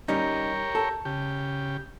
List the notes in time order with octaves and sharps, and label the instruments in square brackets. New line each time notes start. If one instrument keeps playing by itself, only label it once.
[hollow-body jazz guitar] G3 C#4 D#4 [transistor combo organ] G4 A#4 C#5
[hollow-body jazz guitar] A4
[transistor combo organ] C#3 G4